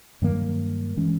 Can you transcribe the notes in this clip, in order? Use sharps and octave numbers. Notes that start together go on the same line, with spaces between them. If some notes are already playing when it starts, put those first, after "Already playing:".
G2 D#3 F#3 A#3
E3 G#3 C#4